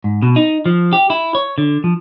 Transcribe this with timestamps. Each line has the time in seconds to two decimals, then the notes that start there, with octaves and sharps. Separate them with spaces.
0.04 G#2
0.22 B2
0.36 D#4
0.66 F3
0.93 G4
1.10 E4
1.35 C#5
1.58 D3
1.84 F3